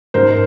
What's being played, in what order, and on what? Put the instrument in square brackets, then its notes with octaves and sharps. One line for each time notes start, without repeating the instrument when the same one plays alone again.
[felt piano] G#2 A#4 C5